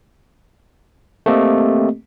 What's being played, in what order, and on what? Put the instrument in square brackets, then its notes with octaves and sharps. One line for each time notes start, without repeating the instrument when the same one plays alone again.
[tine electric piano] A3 A#3 C4 G4 A4 D#5